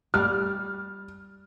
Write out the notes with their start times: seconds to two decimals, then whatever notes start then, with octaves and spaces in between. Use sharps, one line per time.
0.14 G3 F6